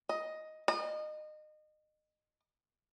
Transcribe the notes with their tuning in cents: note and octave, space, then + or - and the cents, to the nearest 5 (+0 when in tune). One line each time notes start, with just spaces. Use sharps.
D#5 +5
D#5 -30